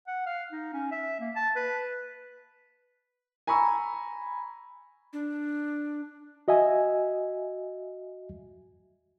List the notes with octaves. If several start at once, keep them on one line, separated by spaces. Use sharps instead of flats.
F#5
F5
D#4
C#4
E5
A#3
A5
B4
G#5 A#5 B5 C#6 E6
D4
F#4 D#5 E5 G#5